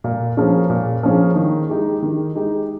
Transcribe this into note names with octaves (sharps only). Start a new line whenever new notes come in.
A#2
F3 A#3 C#4 G#4
A#2
F3 A#3 C#4 G#4
D#3
G#3 D#4 G4
D#3
G#3 D#4 G4